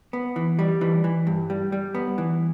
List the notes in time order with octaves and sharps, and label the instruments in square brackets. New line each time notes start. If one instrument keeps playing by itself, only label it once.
[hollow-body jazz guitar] B3
E3
G3
E3
E3
G2
G3
G3
B3
E3